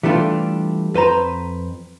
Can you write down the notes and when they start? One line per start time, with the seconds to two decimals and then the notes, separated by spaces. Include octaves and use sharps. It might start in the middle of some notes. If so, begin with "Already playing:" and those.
0.03 E3 G3 A3 D4 F4
0.94 F2 B4 C5 A#5